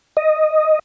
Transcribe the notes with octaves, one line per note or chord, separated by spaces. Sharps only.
D#5